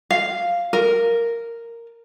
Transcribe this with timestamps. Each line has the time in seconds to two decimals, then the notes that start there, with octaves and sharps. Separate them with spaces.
0.11 F5
0.73 A#4